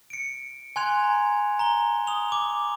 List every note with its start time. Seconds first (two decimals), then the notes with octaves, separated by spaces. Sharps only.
0.10 C#7 D7
0.76 G#5 C6 F#6 G#6 F7
1.03 A#5
1.59 A#5 G7
2.07 D#6 F7 G7
2.32 D6